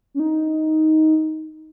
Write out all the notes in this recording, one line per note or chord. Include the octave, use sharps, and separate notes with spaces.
C#4
D#4